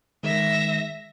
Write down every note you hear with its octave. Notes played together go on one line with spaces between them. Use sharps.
D#3 G#3 E5 A#6